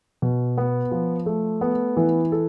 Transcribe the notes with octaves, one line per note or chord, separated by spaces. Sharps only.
B2
B3
F3
A3
B3
E3
A4